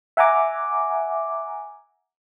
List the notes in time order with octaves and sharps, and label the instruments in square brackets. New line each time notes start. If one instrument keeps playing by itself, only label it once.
[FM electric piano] E5 F#5 G#5 A#5 D6